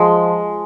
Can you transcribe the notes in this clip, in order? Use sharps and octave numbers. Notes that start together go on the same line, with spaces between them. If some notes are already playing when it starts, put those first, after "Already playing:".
Already playing: F3 G#3